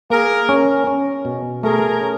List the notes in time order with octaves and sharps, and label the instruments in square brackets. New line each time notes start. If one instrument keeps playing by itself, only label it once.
[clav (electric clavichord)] A#3 [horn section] G#4 A#4
[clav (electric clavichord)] C#4
C#4
B2
[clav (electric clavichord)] A3 [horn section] G#4 A#4
[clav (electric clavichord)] C#4